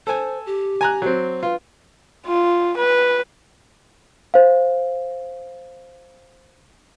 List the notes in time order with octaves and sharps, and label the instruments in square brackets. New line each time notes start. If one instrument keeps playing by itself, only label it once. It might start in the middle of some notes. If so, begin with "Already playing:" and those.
[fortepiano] A4 G#5 [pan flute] C5
[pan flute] G4
[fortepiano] G#5 A#5 F#6
F#3 C4
[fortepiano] F4 [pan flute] B4
[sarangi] F4
B4
[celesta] C5 F5